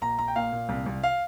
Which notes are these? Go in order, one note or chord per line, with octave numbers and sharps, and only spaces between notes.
A#1 A#5
A#1 A#5
G5
A#2 F5
A#2
C2
C2
F5